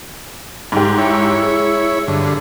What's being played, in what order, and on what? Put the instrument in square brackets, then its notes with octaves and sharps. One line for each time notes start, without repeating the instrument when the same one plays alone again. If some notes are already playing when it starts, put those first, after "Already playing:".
[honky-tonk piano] G#2 G4
[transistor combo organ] E4 C#5
[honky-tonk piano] G#3
[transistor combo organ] G2 D3